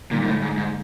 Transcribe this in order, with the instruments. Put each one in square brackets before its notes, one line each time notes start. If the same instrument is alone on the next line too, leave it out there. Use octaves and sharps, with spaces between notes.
[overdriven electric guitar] A#2 [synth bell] D3 G3 A#3 D#4
[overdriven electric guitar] G#2
A2
G#2
G#2